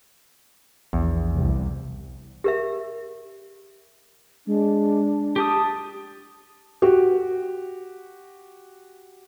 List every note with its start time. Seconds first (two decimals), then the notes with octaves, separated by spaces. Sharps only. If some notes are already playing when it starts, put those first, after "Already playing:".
0.93 A#1 E2
1.34 C2
2.44 G4 A#4 E5
4.47 G#3 D4
5.36 G4 A5 D#6
6.82 F#4 G4